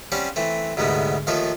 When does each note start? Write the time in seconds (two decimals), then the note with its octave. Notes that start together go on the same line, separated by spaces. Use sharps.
0.12 G3 C4 C#4 F5 F#5
0.36 E3 A3 C4
0.77 D2 G#2 C3 G3 G#3 B3
1.27 D#2 D#3 F3 A3 A4 C#6